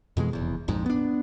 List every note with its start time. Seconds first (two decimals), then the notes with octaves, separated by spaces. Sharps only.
0.17 F2 B2 E3 G#3
0.33 F1 E2
0.68 A#1 F2 G#2
0.86 B3 D4